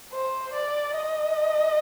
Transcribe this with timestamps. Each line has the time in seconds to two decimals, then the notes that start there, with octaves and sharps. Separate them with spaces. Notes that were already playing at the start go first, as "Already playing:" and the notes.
0.13 C5
0.53 D5
0.95 D#5